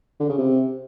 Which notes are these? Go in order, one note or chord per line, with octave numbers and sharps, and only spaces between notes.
D3
C#3
C3